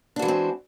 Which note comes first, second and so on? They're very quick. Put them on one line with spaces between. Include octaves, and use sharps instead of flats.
D4 F#4 E3 G#3 C4